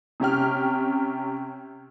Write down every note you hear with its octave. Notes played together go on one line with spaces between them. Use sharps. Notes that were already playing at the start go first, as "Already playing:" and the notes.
C3 C#4 G4 F6